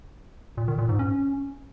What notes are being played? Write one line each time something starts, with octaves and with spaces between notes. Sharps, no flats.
A#2
D#3
A#2
G#2
C#4